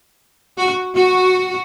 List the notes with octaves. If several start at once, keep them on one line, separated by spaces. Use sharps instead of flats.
F#4
F#4